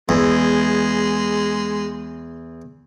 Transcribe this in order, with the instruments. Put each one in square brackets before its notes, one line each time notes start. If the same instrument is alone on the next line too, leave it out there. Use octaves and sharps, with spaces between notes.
[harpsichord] E2 [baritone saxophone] G#3